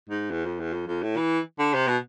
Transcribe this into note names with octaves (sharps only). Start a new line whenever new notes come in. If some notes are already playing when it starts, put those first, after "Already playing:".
G#2
E2
F2
E2
F2
F2
A2
E3
D3
C3
B2